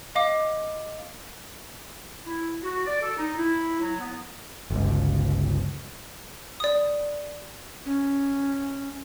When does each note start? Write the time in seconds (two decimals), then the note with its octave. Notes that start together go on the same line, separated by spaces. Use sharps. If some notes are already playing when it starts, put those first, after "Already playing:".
0.15 D#5 F5 D6
2.26 E4
2.63 F#4
2.86 D5
3.02 A4
3.18 D#4
3.37 E4
3.81 F#3
3.99 B3
4.70 G1 C#2
6.60 D5 D#6
7.86 C#4